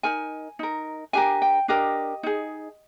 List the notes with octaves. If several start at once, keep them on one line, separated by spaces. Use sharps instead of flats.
D#4 A#4 G#5
D#4 A#4
D4 G4 A#4 G#5
G5
D4 G4 A#4 D#5
D#4 G#4